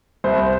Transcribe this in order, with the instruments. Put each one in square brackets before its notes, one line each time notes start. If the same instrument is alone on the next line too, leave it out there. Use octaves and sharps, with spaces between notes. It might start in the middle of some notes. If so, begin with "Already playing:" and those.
[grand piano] C2 C5